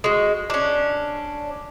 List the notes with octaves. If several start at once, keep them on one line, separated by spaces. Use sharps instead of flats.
G#3 F#4
C#4 D4